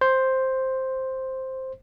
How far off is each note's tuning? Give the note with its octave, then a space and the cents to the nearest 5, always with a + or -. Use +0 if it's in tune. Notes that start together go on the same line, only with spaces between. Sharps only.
C5 +5